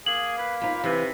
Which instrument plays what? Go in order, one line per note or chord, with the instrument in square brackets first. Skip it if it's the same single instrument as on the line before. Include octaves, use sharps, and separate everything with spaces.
[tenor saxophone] A#3 [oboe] G#4 [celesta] F#7
[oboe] B4
[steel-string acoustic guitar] D#4 F4 [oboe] B5
[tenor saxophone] C3 [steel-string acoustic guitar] E3